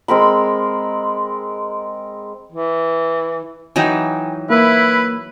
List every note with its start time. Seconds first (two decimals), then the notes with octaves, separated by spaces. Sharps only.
0.08 G#3 C4 A#4 B5
2.52 E3
3.76 E3 F#3 D#4 G5 G#5
4.50 A#3 E4 B4